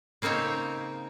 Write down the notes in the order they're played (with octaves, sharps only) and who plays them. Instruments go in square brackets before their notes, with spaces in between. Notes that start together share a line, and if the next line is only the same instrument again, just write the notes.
[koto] C#3 A#3 C4 D#4 C#5 E5